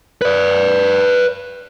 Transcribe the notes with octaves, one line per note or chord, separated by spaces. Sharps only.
B4 D5